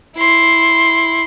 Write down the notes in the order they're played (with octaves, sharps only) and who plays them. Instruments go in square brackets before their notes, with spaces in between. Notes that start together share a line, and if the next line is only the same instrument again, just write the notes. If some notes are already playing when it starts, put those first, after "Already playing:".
[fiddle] E4 C6